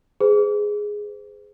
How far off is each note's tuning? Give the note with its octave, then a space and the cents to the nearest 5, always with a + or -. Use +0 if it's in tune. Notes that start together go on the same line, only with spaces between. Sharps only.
G#4 +0 C5 -45